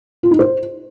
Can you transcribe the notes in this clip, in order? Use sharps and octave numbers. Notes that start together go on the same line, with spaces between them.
F4
D#4
C5